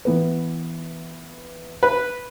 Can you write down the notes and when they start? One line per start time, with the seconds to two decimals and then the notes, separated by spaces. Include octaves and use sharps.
0.05 E3 B3 B4
1.83 B4